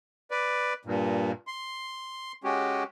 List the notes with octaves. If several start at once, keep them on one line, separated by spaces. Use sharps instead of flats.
B4 D5
G2 A#2
C6
G#3 C#4 F#4 G4